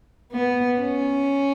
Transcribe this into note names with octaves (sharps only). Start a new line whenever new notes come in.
B3
C#4